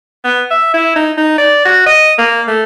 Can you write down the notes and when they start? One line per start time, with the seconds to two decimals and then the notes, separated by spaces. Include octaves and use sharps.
0.25 B3
0.51 E5
0.74 E4
0.96 D#4
1.18 D#4
1.38 D5
1.65 F#4
1.86 D#5
2.18 A#3
2.47 A3